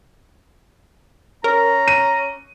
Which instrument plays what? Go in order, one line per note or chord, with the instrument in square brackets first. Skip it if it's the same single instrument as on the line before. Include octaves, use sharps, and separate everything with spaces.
[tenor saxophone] C#4 [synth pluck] A#4 [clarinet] A#5
[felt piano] D#7